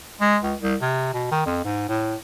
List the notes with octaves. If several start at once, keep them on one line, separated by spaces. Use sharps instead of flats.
G#3
C#2
C2
C3
B2
D#3
F2
G#2
A2